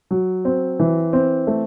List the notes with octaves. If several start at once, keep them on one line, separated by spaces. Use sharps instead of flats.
F#3
C4
E3
C4
A3